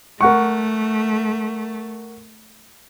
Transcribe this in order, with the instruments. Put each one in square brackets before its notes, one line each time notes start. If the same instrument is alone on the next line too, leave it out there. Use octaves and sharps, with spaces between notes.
[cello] A3 [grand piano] A#4 F#5 C#6